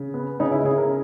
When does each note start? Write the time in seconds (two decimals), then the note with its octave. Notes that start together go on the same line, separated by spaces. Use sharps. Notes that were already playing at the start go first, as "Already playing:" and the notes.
Already playing: C#3
0.14 B3
0.40 C#3 D#4
0.52 E4
0.64 C#3 G#4
0.78 A#4